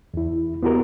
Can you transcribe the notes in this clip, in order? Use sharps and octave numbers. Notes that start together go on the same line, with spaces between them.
E2 E4
B3 E4 F#4 G4 A#4